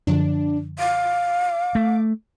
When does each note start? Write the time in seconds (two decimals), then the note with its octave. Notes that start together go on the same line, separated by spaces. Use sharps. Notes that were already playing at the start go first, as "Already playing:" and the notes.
0.07 F#2 D3 F3 D4
0.79 F5 D6
1.75 A3